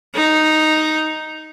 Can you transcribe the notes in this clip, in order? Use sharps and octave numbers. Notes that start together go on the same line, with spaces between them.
D#4